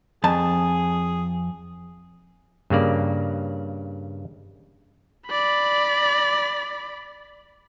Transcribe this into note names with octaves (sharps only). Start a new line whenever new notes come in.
F2 G#4 A5
G2 C#3 A#3 D5
D5 B5